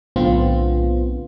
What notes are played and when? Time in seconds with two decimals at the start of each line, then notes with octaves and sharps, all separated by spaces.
0.16 B1 A2 D3 B3 C4 F4